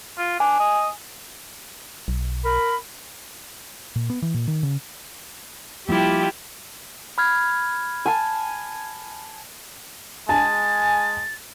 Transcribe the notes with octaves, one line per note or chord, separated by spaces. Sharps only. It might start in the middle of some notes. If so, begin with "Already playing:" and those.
F4
D4 G#5
D#5
B1
A#4 B5
A#2
B3
E3
A#2
D#3
C#3
F3 G3 A#3 E4 F4 G4
B5 F6 G#6
G#5 A5
G#3 G#5 A5 A6